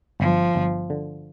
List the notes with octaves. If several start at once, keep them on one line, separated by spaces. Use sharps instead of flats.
G1 F3
G1
D3